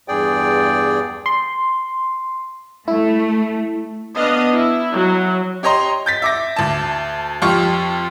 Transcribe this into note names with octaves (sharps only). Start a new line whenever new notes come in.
E2 G2 G#4 D5 G5
C6
A3 E4
B3 D4 D#5 F5
E4
F#3
G4 C#5 D#5 A#5 C6
G6 A6 B6
E5 D6 A#6
D2 A5
F2 F4 G4 C#6 F6